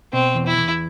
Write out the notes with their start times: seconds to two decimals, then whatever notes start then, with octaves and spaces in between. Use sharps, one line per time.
0.13 B2 C4
0.35 E2
0.46 E4
0.57 E2